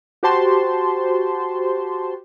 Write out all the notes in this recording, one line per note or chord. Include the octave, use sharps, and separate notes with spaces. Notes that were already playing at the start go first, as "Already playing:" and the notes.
F#4 G4 C5 A5 C6